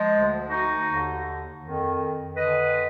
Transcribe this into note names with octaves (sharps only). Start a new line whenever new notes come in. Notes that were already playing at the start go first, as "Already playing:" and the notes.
Already playing: F3 G#3
D2 D3
D#4 F#4
D#2 D3
F2 D#3
F2 D3 B4 D#5